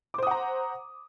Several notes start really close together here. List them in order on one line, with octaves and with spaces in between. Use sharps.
D6 C5 D#6 F#5 A#5